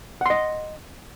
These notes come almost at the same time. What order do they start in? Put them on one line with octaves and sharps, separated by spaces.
F#5 C6 D#5